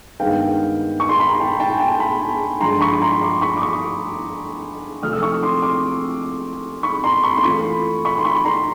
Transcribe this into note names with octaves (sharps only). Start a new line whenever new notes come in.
G2 D#3 G#3 B3 F5 G5
C#6
C6
B5
A#5
G5 A5
G5 A5
G#5
G5 A5
A5 B5
G2 D3 F3 G#3 A#5 C6
B5 C#6
A#5 C6
C6 D6
B5 C#6
D6
C#6 D#6
C3 F3 A3 C4 D#6 F6
E6
C#6 D#6
C6 D6
C6 D6
B5 C#6
A#5 C6
B5 C#6
C6
E3 A3 C#4 F4 B5 C#6
B5 C#6
C6
B5 C#6
A#5 C6